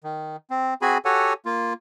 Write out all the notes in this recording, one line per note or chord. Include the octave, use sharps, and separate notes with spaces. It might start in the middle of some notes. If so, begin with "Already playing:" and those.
D#3
C4
C4 F#4 G#4 G#5 B5
F#4 G4 A4 C#5 F#5 G#5
A#3 F4